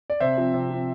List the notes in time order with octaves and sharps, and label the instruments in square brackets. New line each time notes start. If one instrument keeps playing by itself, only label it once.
[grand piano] D5
C3 C5 E5
F3 C4
C3
F3 C4